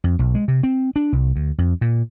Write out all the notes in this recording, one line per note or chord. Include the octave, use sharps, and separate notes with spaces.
F2
B1
G#3
C3
C4
D4
C2
D2
F2
A#2